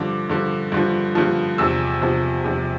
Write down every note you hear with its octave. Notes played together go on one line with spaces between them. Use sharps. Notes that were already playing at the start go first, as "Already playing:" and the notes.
Already playing: G2 D3 F3 D6
G2 D3 F3
G2 D3 F3
G2 D3 F3
E2 C3 F3 E6
E2 C3 F3
E2 C3 F3